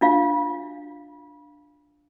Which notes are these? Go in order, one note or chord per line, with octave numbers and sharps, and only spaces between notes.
D4 F4 F5